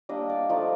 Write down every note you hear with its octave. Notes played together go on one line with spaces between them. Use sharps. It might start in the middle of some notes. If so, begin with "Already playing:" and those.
G3 A#3 D4 D#5
D5
F3 A3 D#4 D5